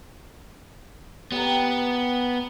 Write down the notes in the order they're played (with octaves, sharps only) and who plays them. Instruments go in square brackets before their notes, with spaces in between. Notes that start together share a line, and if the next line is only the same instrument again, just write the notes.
[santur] G3 A#4 [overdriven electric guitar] B3